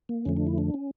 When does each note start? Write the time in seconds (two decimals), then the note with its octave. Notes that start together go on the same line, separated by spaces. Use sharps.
0.09 A#3
0.25 F2 D3 F3 A3 C#4
0.37 D4
0.47 E4
0.58 D4
0.74 C#4